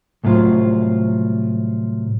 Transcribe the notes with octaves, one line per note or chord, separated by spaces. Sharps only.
C2 A2 F#3 F4 C5